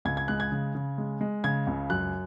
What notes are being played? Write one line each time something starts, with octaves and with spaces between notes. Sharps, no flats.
C#2 G#6
G#6
G#3 F#6
G#6
C#3
C#3
G#3
G#3
C#3 G#6
C#2
F#2 F#6